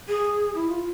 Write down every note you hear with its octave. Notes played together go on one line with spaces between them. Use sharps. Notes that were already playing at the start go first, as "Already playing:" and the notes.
G#4
E4
F4